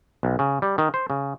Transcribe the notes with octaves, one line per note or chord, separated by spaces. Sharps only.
B1
C#3
G3
D#3
C5
C#3